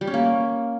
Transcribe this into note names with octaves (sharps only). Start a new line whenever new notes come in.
G3
C#4
A#3